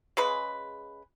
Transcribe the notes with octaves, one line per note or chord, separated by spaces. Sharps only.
C#3 G#3 B4